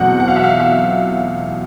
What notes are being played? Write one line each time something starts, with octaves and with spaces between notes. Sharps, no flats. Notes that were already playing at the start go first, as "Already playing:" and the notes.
Already playing: E2 B2 F#3 A3 C4 F#5
F#5
F5
E5
F5
E5